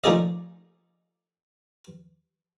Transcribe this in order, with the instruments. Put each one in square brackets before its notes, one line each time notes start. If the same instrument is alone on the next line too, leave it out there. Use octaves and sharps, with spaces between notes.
[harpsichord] F3 A3 D#4 G#4 D5 D#5